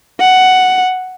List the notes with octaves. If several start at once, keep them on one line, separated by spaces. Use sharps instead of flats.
F#5